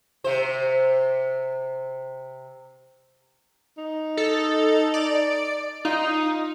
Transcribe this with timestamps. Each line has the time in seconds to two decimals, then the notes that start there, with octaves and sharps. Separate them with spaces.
0.24 C3 C5
3.78 D#4
4.17 A4
4.94 D5
5.85 D#4 F4